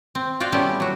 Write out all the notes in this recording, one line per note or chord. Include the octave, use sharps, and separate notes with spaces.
C4
F4 F#4 D5 F5 G5
G3 A3 B3 C#4 E4 G4
F#3 F#4